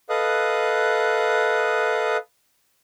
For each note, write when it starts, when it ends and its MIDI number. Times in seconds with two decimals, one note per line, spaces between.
0.09 2.17 69
0.09 2.17 71
0.09 2.17 75
0.09 2.17 77
0.09 2.17 87
0.09 2.17 90